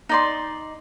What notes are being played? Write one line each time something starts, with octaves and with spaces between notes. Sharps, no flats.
D#4 D5 C6